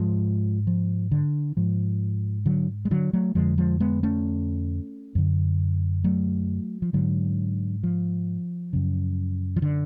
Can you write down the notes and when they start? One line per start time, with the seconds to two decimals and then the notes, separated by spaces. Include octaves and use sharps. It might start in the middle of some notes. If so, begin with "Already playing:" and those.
Already playing: G#2 F3 G#3
0.67 F3
1.11 D3
1.57 G#2 F3
2.46 D3 F#3
2.85 G#3
2.91 D3 F#3
3.13 F#3 A3
3.35 F2 D3 F3 G#3
3.58 F3 G#3
3.80 G#3 B3
4.03 A3 C#4
5.15 F#2 D3
6.04 F#3 A3
6.82 F3
6.93 G#2 D3 F#3
7.83 F3
8.73 F#2 C#3
9.56 F3
9.62 D3